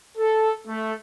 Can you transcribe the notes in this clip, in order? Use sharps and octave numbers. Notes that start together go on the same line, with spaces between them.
A4
A3